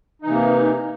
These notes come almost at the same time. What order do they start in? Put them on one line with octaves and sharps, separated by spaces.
D#4 E3 C3 A#3